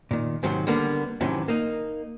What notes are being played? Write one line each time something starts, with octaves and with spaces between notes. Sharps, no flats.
A#2 D#3
G#2 C3 D#3 F#3
D3 G3 A#3 B3
A2 C3 D#3 E3 F#3 C#4
A#3 D#4